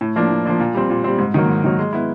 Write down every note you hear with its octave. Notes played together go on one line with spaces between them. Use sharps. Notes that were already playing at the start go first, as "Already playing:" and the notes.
A2
F3 A#3 D4
A2
F3 A#3 D4
A#2
G3 C4
A#2
G3 C4
G#2
D#3 F#3 A#3
G#2
D#3 F#3 A#3
G#3
B3 E4